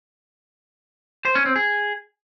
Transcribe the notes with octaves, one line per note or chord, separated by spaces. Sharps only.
C5
C#4
C4
G#4